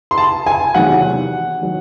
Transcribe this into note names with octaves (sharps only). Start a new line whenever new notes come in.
C6
A5
G#5
E2 C3 D#3 F#3 F#5
D#3 F#3